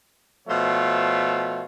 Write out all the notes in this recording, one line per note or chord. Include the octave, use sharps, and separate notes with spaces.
B2 F3 A3 C5 C#5 F5